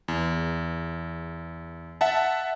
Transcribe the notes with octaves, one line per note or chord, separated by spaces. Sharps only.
E2
E5 F#5 A5